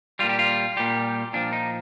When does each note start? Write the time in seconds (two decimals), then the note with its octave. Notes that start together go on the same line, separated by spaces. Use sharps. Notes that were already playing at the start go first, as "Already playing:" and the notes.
0.19 A#2 G3 F4
0.29 G4
0.39 F4
0.77 A#2 G3 G4
1.33 A#2 F3 D4
1.53 D#4